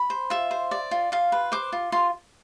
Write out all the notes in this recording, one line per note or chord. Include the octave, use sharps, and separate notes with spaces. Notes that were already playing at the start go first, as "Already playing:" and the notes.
Already playing: B5
C5
F4 E5
C5
D5
F4
F4 F5
B4
C5 D6
F4
F4 C6